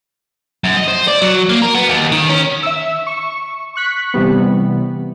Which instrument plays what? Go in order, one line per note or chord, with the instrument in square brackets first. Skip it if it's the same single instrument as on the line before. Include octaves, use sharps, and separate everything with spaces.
[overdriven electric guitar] F#2
D#5
C5
D5
F#3
A#3
A#4
B3
D#2
D#3
C#4
[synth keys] E5 E6
C#6
C#6 F#6 B6
C3 E3 G3 B3